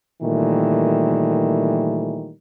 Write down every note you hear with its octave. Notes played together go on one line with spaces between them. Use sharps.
A#2 D#3 E3 G3 A3